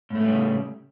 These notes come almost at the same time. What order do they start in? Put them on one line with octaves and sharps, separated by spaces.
A2 A3 C#4 G3 C#3